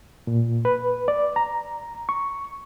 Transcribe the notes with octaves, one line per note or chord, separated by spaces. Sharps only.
A#2
B4
D5
A#5
C#6